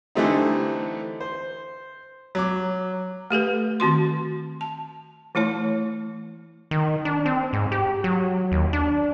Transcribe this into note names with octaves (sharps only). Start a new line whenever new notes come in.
D3 E3 G3 A3 C4 D#4
C5
F#3 D6
A3 G4 A4 B4
D#3 C4 F#4 C6
A5
E3 A3 E4 C#5
D#3
D4
C4
G#2
G4
F#3
D#2
D4